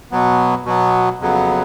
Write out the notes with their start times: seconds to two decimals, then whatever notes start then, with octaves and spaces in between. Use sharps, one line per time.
0.11 B2 F#3 B3
0.66 B2 F#3 B3
1.20 F2 C#3 F#3 B3